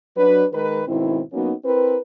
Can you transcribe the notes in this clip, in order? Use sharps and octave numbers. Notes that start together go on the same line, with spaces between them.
F#3 D4 B4
D#3 G#3 A#4 B4
G#2 B2 D#3 C4 E4
F#3 A#3 B3 C#4 D#4 F#4
C4 E4 A#4 B4